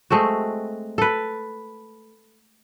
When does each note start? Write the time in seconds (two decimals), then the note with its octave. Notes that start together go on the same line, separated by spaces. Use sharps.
0.10 G#3 A3 C4 F#4
0.98 A4 B4